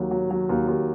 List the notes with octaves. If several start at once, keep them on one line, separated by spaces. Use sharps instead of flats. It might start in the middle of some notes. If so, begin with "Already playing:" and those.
Already playing: D#2 F#3
F#3
F#3
D#2
D#2